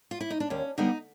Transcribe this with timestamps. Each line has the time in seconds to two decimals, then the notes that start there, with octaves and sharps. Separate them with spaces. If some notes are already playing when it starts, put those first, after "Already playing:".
0.11 F4
0.20 E4
0.30 D#4
0.40 D4
0.50 D#2 C#4
0.78 D3 G3 B3 D#4